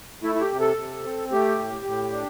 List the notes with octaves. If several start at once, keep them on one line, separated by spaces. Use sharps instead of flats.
A3 E4
E4
G4
C3
A4
C3
C4
A3 G4
A2
A2
D4